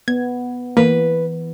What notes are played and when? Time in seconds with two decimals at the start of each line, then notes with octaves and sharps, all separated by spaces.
0.08 B3 G#6
0.77 E3 A#3 B4